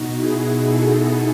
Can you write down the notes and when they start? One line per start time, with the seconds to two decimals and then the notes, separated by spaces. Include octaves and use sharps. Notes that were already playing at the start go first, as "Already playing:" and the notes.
Already playing: B2 D#4 F#4
0.16 E4 G#4
0.66 F#4 A4